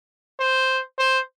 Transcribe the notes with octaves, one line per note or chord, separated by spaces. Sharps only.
C5
C5